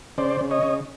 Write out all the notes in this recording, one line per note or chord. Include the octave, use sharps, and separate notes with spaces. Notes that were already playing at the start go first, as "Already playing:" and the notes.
C#3 C5 D5
C#3
C#5 D#5
C#3